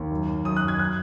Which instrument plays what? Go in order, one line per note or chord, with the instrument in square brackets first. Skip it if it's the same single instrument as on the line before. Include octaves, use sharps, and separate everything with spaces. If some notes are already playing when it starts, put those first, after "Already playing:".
Already playing: [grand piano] D#2
F#2
F#2
F#2 D#6
F#6
F#2
G#6
F#3 F#6